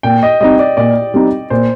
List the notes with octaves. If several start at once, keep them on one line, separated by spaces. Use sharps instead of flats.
A#2 G5
D#5
G3 C4 D#4 D#5
D5
A#2 D5
G3 C4 D#4
A#2 C5